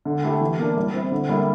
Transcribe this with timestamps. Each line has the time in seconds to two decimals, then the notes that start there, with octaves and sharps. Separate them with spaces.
0.05 D3
0.23 A3 E4 G4
0.41 E3
0.59 A#3 D4
0.77 G3
0.94 C4 E4
1.12 D3
1.29 G3 A#3 E4